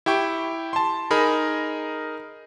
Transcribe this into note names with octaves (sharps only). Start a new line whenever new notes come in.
E4 G4 G5 C#6
A5 C6
D#4 G#4 A#4 B5